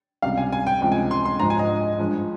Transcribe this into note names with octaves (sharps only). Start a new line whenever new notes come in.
C#2 C3 G3 F5
G#5
G#5
G5
C#2 C3 F3 G#3 G5
G#5
C6
C6
G#2 F3 G#3 A#5
G#5
D#5
D#5
G2 F3 G#3